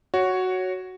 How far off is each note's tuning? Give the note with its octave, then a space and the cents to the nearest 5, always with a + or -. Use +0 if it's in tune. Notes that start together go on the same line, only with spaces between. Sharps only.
F#4 +0 C#5 +0